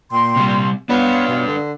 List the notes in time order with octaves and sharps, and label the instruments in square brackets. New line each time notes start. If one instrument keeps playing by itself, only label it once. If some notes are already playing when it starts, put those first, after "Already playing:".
[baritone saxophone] A#2 [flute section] G5 C6
[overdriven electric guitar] C3 G3
[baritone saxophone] B3 [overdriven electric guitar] D4 B4 [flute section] F4 C#5
[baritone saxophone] B2
D3